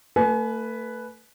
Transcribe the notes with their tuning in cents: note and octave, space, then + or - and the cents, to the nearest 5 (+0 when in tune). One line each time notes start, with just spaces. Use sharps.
A3 +35 B4 +0 G#5 +35